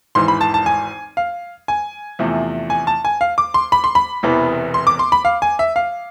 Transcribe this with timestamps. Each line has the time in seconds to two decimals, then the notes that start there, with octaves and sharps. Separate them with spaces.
0.15 G#1 G#2 E3 C6
0.28 B5
0.41 A5
0.54 A5
0.66 G#5
1.17 F5
1.68 G#5
2.19 E2 C3 F3 A3
2.70 G#5
2.87 A5
3.05 G#5
3.21 F5
3.38 D6
3.54 C6
3.72 B5
3.84 C6
3.95 B5
4.23 E1 E2 C3 E3 B3
4.74 C6
4.87 D6
4.99 C6
5.12 B5
5.25 F5
5.42 G#5
5.59 E5
5.76 F5